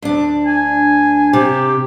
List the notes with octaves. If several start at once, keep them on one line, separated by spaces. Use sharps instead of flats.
D2 D4
G#5
C3 G4